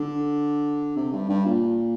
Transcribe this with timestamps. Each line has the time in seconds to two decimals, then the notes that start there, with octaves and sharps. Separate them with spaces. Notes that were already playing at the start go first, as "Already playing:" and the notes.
Already playing: D3
0.96 C3
1.13 G2
1.29 G2
1.46 A#2